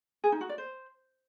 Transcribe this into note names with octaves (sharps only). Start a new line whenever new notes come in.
G#4
D#4
F#4
D5
C5